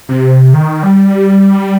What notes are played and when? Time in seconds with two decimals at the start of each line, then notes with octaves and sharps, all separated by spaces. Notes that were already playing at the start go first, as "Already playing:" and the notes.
0.09 C3
0.53 D#3
0.83 G3